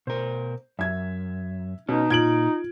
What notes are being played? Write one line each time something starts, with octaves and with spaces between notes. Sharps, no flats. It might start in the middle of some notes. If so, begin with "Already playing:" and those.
B2 A#4 C5
F#2 E5 G#6
B2 C#4 D#4
A#2 F4 G#6 D7 F#7